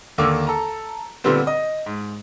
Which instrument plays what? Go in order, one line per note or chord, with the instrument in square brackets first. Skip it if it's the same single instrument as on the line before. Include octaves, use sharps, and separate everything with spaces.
[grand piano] D#2 D3 A#3 D6 E6
A4 A#5
A#2 D3 G3 B3 C4
D#5
G#2